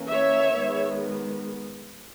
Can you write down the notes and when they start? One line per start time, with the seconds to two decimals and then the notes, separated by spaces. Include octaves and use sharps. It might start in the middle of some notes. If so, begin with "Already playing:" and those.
Already playing: E3 A#3 C#4
0.10 C#5 E5
0.58 D#3 G#3 B3